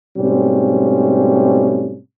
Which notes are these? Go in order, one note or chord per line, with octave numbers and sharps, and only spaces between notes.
G#2 B2 G3 A3 C4 C#4